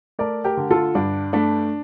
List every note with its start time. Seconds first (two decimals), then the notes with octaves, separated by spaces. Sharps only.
0.19 A3 A#4 D5
0.44 G4 A#4
0.57 D3
0.71 F4 A4
0.95 G2 D4
1.33 A3 D4